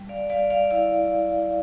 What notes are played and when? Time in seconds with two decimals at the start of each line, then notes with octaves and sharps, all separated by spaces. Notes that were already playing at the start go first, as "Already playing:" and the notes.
Already playing: G3
0.09 D5 F5
0.30 G3 D5 F5
0.50 D5 F5
0.71 E4 D5 F5